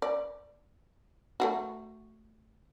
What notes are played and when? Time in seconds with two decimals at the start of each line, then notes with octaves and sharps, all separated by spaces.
0.02 D5
1.40 A3 F4 F#4